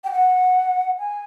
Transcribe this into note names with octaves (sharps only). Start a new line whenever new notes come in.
G5
F#5
G#5